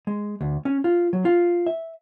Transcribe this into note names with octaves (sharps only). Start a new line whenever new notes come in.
G#3
D2
C#4
F4
F#3
F4
E5